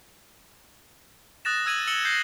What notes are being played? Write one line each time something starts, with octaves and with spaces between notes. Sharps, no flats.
D#6 F#6 A6 A#6 E7
E6 G#6 D#7 F#7
E6 C#7 E7 F#7 G7
G6 A#6 C7